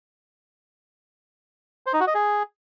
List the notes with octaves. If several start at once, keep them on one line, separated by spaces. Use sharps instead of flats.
C5
D#4
F#4
D#5
G#4